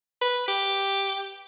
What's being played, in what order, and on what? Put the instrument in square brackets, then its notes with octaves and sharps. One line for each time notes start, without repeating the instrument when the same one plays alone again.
[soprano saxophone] B4
G4